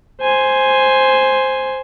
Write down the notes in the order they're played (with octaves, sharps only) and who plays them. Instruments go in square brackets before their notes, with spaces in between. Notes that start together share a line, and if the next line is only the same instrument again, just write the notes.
[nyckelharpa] C5 G#5